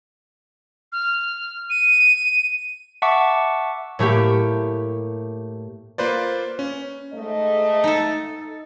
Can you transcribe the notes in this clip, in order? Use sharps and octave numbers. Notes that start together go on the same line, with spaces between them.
F6
D#7
E5 F#5 A5 C#6 D6
A2 A3 A#3 G4
A#3 F4 B4 C5 D5
C#4
G#2 A3 D#5
D#4 A4